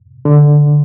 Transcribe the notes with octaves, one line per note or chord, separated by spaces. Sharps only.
D3